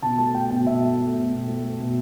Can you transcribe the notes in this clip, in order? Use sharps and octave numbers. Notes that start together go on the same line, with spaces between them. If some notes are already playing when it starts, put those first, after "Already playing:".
B2 A5
A3 A5
A3 G5
B2 G5
B2 E5
A3
A3
B2
B2
A3
A3
B2